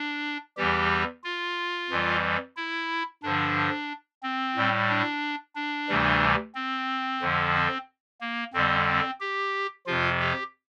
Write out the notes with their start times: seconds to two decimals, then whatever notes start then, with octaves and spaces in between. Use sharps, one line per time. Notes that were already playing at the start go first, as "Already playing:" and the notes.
Already playing: D4
0.57 E2 E3 G3 G4
1.24 F4
1.90 F2 E3 G3
2.57 E4
3.23 G2 D3 F3 D4
4.23 C4
4.56 A2 G3
4.89 D4
5.56 D4
5.89 D2 C3 E3 G3
6.55 C4
7.21 F2 D3 F3
7.55 C4
8.21 A#3
8.54 F2 D3 G3 C4
8.88 C4
9.20 G4
9.86 F2 C3 F3 F4
10.20 G4